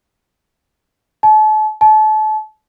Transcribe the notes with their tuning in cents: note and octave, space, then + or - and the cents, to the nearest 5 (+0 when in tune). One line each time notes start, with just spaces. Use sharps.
A5 -35
A5 -30